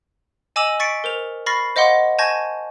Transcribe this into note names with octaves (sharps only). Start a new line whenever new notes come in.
D#5 G#5 D6 E6 E7 F#7
C#6 A6 B6 C#7 D7
A#4 C5 F7
B5 C#6 F6 A6 A#6 C7
C5 D#5 F5 F#5 C6 D6
G#5 A5 C#6 G6 G#6 A#6